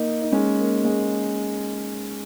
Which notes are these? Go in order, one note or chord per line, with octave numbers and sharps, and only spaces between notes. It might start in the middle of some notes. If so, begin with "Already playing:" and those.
Already playing: A#3 D#4
D#4
G#3 C#4
A#3
G#3